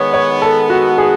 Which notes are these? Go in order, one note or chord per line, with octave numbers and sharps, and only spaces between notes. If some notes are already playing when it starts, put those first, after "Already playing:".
Already playing: D#3 G#3 B3 C#5
C#5
A4
F#4
G#4